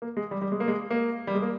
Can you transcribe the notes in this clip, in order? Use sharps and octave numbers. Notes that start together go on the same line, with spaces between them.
A#3
G#3
G3
G3
G#3
A#3
G#3
A#3
G3
G#3
A#3